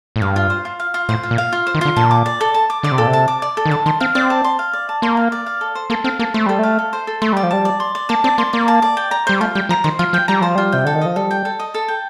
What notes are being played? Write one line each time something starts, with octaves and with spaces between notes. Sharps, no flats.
A2
G2 F5
F4
C5
F4
F5
F4
A2 C5
F4
A#2
F5
F4
C5
D#3
D3 F4
A#2 A5
D6
D5
A4
A5
D6
D3 D5
C3
A#2 A4
C3
A5
D6
D5
A4
D#3
D3 A5
D#3 C6
C4 F5
C4 D5
A5
C6
F5
D5
A5
A#3 C6
F5
D5
F5
A4
C5
A#3 A4
C4 F5
A#3 A4
A3 C5
G3 A4
A3 F5
A4
C5
A4
A3 C6
G3 D5
F3
G3 A5
D5
C6
D5
A#3 A5
C4 D5
A#3 C6
A#3 D5
A5
D5
G5
A#5
G3 C5
A3 F4
G3 G5
F3 A#5
D#3 C5
F3 F4
F3 G5
G3 A#5
F3 C5
G3 F4
C3 G5
D3 A4
D#3
F3 D#5
G3 A4
G5
A4
D#5
A4
G5